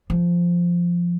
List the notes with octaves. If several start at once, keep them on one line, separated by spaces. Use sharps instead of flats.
F3